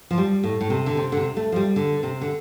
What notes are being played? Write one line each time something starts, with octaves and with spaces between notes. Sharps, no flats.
F3
G3
A2
A2
C3
D3
C3
D3
C3
A3
F3
G3
D3
C3
D3